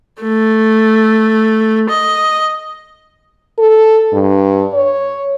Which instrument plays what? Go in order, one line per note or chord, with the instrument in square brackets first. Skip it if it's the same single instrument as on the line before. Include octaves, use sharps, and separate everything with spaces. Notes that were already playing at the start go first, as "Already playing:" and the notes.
[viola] A3
D#5
[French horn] A4
G2
C#5